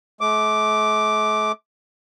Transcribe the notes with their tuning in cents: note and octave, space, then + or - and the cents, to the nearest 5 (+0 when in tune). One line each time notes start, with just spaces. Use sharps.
A3 -45 D6 +0